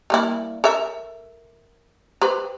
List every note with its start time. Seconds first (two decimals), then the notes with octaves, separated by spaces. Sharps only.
0.10 G3 A#3 E4
0.64 A4 A#4 E5
2.22 G4 B4 C5